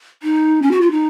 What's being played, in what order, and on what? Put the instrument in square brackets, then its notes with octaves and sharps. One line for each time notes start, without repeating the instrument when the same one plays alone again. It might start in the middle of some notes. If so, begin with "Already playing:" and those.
[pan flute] D#4
C#4
F#4
F4
D#4